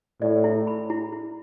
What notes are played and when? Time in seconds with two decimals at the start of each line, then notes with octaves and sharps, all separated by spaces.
0.21 A2 D5
0.44 E4
0.67 B5
0.90 E4
1.13 E4